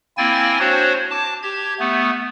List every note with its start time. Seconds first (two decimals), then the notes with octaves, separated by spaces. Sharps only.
0.18 A#3 C4 E4 G5 G#5 A6
0.59 D4 F#4 C5 C#5
1.11 A5 D6
1.43 G4 G#6
1.79 A3 B3